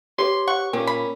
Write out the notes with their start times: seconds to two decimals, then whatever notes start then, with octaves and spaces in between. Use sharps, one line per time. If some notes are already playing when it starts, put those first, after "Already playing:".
0.18 G4 B4 C#5 C6
0.48 F#5 C#6
0.73 A#2 C#4 G4 A#4
0.87 B5